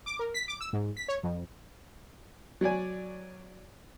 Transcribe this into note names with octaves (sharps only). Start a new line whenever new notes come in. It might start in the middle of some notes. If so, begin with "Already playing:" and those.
D6
A#4
B6
D6
E6
G#2
B6
C#5
F2
F#3 C#5 D5 G#5